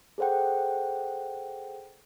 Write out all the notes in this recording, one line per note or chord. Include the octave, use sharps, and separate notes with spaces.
G#4 A4 C5 F#5 G5